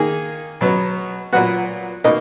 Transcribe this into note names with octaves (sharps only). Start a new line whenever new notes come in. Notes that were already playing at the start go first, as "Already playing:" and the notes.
Already playing: D#3 A#3 G#4 G#5
B2 F#3 B3
A#2 F#3 B3 F#4 F#5
B2 A#3 D#4 D#5